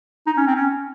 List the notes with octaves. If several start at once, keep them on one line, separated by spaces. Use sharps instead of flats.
D#4
C#4
C4
C#4